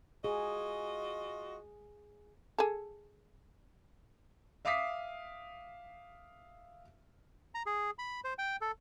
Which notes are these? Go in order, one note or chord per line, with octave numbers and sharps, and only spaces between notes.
F4 F#4 G#4 D#5
G#4 A4
E5 F5 D6 D#6 B6 C7
A#5
G#4
B5
C5
G5
A4